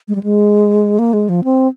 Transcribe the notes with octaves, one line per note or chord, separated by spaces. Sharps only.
G#3
G3
G#3
A#3
G#3
F3
C4